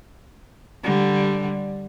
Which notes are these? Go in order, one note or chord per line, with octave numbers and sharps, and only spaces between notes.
D3 G3